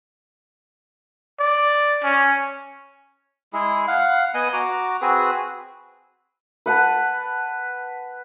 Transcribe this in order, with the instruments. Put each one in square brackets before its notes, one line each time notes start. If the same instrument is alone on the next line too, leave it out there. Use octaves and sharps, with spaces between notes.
[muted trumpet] D5
C#4
[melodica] G#3 E4 G#4
F5 F#5
B3 D#5 F#5 G#5
F#4 A#5 D6
C4 F#4 G#4 B4
[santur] B4 F#5 A5